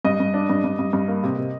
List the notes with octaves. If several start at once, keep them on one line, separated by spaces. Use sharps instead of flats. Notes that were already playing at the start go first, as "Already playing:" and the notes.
G2 D#5
G2
D4
G2
G2
G2
G2
A#3
C3
C3